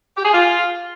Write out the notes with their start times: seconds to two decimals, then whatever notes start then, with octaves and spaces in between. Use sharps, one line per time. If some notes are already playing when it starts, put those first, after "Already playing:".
0.17 G4
0.24 G#4
0.32 F4